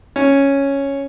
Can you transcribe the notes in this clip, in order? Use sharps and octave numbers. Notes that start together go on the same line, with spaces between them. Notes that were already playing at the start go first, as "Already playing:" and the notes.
C#4